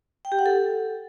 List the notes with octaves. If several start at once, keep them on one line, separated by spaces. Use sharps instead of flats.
G5
G4
F#5
A4